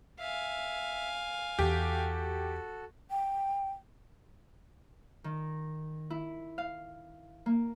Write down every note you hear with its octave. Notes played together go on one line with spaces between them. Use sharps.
E5 F5 G#5
E2 E3 F#4 G4 A4
G5
D#3
E4
F5
A#3